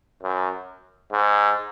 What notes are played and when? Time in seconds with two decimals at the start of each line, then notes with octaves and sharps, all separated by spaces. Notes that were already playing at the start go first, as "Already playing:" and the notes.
0.23 F#2
1.12 G#2